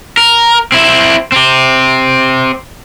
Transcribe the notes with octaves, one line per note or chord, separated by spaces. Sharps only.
A#4
C4 E4
C4 G4